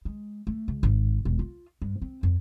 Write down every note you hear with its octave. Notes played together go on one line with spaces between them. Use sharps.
G#3
A3
C#2
G#1
E1
F4
G2
C4
F2